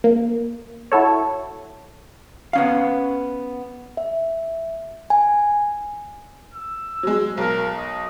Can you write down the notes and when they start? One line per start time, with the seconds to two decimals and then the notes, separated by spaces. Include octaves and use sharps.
0.04 A#3
0.92 E4 F#4 A4 C#5
2.53 B3 C#4 F5
3.97 E5
5.10 G#5
6.54 E6
7.03 F#3 G#3
7.37 B1 A#4
7.77 D#5